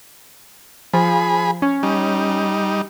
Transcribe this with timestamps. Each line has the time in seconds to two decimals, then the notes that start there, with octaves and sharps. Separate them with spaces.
0.94 F3 G#4 B5
1.62 C#4
1.83 G3 D#4